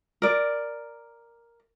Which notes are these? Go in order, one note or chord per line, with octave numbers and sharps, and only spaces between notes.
A#4 D5